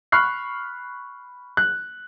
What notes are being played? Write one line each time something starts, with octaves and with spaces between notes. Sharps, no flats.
B5 C#6 F6 F#6 C7
F#6